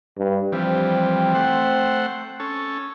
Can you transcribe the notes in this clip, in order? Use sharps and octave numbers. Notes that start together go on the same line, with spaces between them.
G2
E3 F3 G3 C4
A3 C5 F#5
C#4 A4